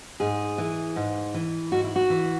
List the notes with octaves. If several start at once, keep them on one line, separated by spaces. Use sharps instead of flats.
G#2 G#4
E3
G#2
E3
G#2 F#4
E4
F#4
E3